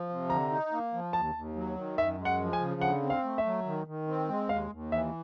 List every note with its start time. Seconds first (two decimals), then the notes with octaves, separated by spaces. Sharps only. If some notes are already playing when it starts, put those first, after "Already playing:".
Already playing: F3
0.09 C3
0.29 D3 A#5
0.51 D#4
0.72 A#3
0.93 F3
1.13 D#2 A5
1.35 D#2
1.56 F#3
1.76 D#3
1.98 F#2 E5
2.18 G#3
2.25 F#5
2.40 F3
2.53 G#5
2.61 C#3
2.81 D3 F#5
3.03 C4
3.10 F5
3.24 A3
3.38 E5
3.45 F#3
3.66 D#3
3.87 D#3
4.08 C4
4.29 G#3
4.49 D#2 F5
4.71 D#2
4.92 E3 E5